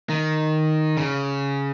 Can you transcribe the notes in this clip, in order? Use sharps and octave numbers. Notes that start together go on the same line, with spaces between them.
D#3
C#3